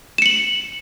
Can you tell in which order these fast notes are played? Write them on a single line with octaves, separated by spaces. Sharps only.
E7 C#7 F#7